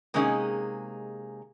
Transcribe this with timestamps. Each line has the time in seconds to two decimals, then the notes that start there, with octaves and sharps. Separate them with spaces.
0.14 C3 G#3 A#3 C#4 D#4 G#4